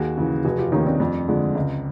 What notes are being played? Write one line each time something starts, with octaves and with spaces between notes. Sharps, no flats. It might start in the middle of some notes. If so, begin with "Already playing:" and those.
Already playing: D#2 F#4 G#4
C#3 E3
F1 F#4 G#4
F4 G4
D#2 D#3 C#4 D#4
C4 D4
F2
D3 F3 G#3
C#2